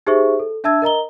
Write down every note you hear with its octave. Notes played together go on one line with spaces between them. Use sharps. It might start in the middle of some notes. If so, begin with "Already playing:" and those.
D#4 G4 G#4 C5 E5 C#6
A4
D4 E5 A5 E6 G#6
A#4 D#5 A#5 G7